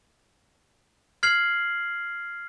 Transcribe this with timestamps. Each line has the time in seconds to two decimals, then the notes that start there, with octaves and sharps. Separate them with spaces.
1.23 F6 G#6 C7 F#7